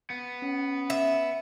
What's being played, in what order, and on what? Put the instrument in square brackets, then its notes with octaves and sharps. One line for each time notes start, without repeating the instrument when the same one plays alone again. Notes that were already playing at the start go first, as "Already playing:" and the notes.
[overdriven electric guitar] B3
[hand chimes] C#4
[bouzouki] E5